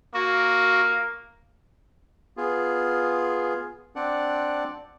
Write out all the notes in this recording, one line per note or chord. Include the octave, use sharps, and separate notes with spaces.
A#3 F#4
B3 F4 G#4
C4 D4 D5 F#5